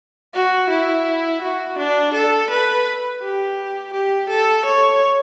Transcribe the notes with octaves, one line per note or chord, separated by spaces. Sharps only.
F#4
E4
F#4
D4
A4
B4
G4
G4
A4
C#5